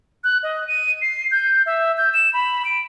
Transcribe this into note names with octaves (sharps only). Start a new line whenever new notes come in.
F#6
D#5
D#7
C7
G6
E5
G6
E7
B5
D7